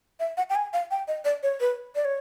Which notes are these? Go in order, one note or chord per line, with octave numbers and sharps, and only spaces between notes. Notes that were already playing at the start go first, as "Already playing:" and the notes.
E5
F#5
G5
G#5
F5
G5
D#5
D5
C#5
B4
D5
C#5